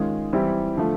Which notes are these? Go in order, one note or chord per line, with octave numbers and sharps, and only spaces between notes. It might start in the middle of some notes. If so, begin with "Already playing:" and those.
Already playing: D#3 G#3 C#4 F4 G#4
E3 G3 C4 E4 G4
D3 F3 A3